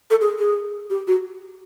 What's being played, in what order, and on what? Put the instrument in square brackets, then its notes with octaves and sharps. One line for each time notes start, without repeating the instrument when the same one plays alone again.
[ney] A4
G#4
G#4
G4
F#4